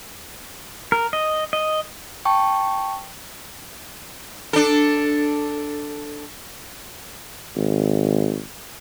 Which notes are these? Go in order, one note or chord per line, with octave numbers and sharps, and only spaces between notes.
A#4
D#5
D#5
G5 A5 C#6
D4 A4
G#1